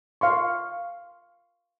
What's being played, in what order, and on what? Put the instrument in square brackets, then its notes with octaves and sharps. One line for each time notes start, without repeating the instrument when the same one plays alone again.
[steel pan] F5 C6 C#6